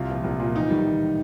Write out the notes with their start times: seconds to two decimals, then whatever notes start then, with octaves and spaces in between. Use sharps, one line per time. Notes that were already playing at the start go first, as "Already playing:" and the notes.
Already playing: C2 F4
0.09 A#2 F3
0.24 C2
0.40 A#2 F3
0.56 A1 D#4
0.70 D#3 G3